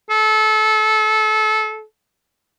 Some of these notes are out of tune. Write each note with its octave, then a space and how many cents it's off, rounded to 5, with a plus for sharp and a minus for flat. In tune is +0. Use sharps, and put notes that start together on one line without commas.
A4 -25